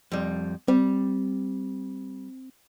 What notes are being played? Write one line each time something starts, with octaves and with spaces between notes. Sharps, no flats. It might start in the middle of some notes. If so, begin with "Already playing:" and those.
F2 G3
G3 C4